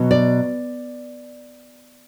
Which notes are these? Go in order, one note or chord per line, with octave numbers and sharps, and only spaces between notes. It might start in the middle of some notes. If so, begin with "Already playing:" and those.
Already playing: B2 F#3
D5